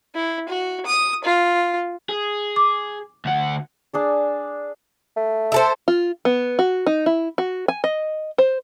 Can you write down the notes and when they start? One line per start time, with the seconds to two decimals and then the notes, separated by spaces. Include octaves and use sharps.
0.15 E4
0.49 F#4
0.86 D#6
1.24 F4
2.09 G#4
2.56 D6
3.25 D2 F#5
3.93 D4 G#4 D5
5.17 A3
5.52 E4 A4 C5
5.88 F4
6.25 B3
6.59 F#4
6.86 D#4
7.06 E4
7.38 F#4
7.68 G#5
7.84 D#5
8.38 C5